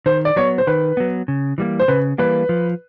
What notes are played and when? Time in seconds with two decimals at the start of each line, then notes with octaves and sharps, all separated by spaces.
0.06 D#3 C5
0.25 D5
0.36 F#3 B3 C#5
0.58 C5
0.67 D#3 B4
0.97 F#3 B3
1.28 C#3
1.58 E3 G3 A#3
1.79 C5
1.88 C#3 B4
2.18 E3 G3 A#3 B4
2.49 F3